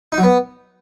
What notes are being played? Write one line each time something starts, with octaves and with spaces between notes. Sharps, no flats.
D#4
F#3
B3